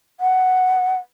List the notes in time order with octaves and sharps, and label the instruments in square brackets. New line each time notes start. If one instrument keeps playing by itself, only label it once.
[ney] F#5